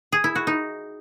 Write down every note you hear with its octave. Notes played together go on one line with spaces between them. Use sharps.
G#4
E4
F#4
D#4